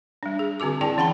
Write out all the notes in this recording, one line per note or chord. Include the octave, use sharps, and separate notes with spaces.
G3 D4
G#4
D3 C4 F#4 G#4 D6
E4 G#4 D5 G5 A5
E3 C#4 F#5 G5 A5 B5